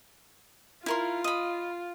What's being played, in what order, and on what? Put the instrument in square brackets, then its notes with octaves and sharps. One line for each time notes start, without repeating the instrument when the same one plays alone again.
[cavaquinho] E4 A#4 C6 [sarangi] F4
[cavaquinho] D#5 B5